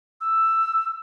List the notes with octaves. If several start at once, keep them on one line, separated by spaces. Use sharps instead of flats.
E6